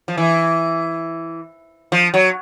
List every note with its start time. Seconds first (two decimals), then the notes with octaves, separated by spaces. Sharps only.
0.08 F3
0.18 E3
1.92 F3
2.14 F#3